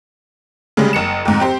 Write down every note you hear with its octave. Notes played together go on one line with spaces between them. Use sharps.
C#3 G3 G#3
F#1 C#7 E7
F2 G#2
C4 G4 C5